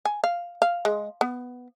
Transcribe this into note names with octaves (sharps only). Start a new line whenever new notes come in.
G#5
F5
F5
G#3
B3